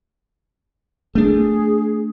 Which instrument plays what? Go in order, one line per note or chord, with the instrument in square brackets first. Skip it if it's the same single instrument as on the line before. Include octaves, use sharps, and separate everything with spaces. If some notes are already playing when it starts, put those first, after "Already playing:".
[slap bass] A3 D4 [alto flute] G#4